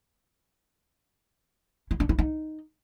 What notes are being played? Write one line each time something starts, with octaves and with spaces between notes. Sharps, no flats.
E4
D4
E4
D#4